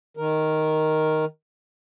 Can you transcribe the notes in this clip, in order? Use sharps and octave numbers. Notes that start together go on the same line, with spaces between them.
D#3 A#4